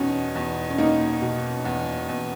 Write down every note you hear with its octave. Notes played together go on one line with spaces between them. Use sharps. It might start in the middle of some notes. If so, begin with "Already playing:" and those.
Already playing: E2 B2 C#4 D#4
E2
C#4
A#3 D#4
B2
E2
E2